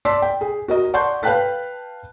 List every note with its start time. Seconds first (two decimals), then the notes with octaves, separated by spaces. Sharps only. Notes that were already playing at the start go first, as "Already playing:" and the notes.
0.05 D5 A5 C6 E6 B6
0.22 G5
0.41 G#4
0.68 F#4 A#4 D#5
0.94 D5 F#5 A5 C6 C#6 G6
1.23 B4 F5 G5 A5 F#6 B6